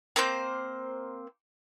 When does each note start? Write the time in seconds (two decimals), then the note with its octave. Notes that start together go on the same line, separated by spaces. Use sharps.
0.16 A#3 C4 C5 G6